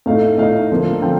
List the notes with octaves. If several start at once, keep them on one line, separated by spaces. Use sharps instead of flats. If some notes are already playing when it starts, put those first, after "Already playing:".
A2 A3 D#4 F5
A2 A3 D#4 F5
D3 F3 A#3
D3 F3 G5